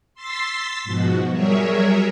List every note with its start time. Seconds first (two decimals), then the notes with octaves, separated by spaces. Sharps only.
0.14 C6 E6 A6 B6 C7
0.84 G#2 B2 F3 F#4
1.30 F#3 G3 G#4 A#4 C#5 E5